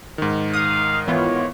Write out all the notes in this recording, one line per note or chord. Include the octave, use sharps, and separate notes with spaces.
G#2 D#3
F5 D#6
E3 B3 F4 C#5